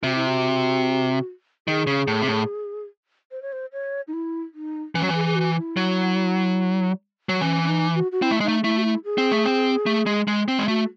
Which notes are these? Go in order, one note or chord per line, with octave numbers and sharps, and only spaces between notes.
C3 F#4
E4
F#4
D#3 G#4
C#3
A2
C3
A2
C5
C#5
C5
C#5
D#4
E4
D#4
E3 C#4
F#3
E3
G#4
G#4
F#4
E4
F#3
F#3
E3 C#4
C#4
D#4
F#4
F#4
C4 E4
A3
G#3
A3 D#4
A3 E4
F#4
E4
G#4
C4
A3
C4
A3
G#3
G#3
C4
G#3
A3 F#4